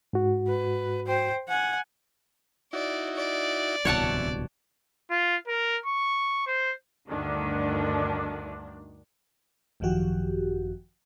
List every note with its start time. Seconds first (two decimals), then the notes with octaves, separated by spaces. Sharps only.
0.13 G#2 F#4
0.48 B4
1.07 C5 G5
1.48 F#5 G#5
2.73 D#4 E4 F#4 D5
3.16 D5
3.85 D1 C2 B2 E3 C#5 F#5 A5
5.11 F4
5.48 A#4
5.86 C#6
6.47 C5
7.09 D2 G2 D3 D#3 D4
9.80 G#1 F#2 D#3 F3 F#4 G4